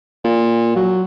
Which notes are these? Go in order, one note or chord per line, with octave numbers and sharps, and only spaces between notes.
A#2
F#3